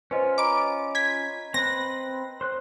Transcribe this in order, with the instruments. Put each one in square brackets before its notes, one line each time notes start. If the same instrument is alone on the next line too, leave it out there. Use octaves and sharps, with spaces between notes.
[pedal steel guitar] C#4 F4 [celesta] B4 C5 D#5
[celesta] D#5 A#5 B5 [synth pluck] D6 D7
[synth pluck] G#6 B6
[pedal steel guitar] C4 B4 [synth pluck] A#6
[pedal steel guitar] C5 F#6